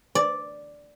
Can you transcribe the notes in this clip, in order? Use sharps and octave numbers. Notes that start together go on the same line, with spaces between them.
D5